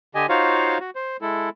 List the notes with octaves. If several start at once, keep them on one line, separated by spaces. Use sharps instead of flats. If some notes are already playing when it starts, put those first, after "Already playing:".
D3 G4 D#5 G#5
D#4 F4 F#4 C5 C#5 F5
F#4
C5
G#3 E4 A4